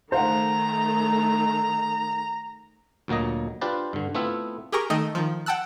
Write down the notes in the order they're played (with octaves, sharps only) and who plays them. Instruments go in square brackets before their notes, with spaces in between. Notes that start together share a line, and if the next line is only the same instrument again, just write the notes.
[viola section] D#3 A3 [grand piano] C5 F5 F#5 [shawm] A#5
[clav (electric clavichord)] D2 A#2 F#3 A#3 D#5
D4 F4 G4 B4 C5 D5
G2 D3
A3 B3 C4 E4 F4 E5
[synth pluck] G4 G#4 A#4 A#5 C#6
D#3 A3 D#5 G5
D#3 F3
F#5 G5 A5 E6 F#6